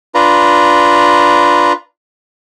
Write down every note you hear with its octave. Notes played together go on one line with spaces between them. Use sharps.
D4 F4 B4 A#5